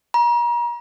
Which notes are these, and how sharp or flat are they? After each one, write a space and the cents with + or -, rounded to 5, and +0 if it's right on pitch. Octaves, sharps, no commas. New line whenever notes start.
A#5 +40